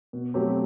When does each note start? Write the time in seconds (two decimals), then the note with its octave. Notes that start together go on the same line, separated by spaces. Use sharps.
0.13 B2
0.34 F#3 A3 C4 G4